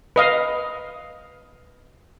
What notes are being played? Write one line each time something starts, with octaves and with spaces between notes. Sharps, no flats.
B4 D#5 F5